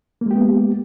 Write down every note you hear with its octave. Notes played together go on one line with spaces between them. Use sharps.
G#3 A#3 B3 G4